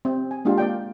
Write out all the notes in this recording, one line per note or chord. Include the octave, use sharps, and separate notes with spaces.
C4
G#5
G#3 A#3 D4 F4 G4
A#3 D5 G5